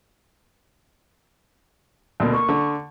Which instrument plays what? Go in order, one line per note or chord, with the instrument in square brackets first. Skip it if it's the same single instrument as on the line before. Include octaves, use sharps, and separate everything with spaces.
[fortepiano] D2 B2 A#3
[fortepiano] A#3 [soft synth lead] C#6
[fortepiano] D3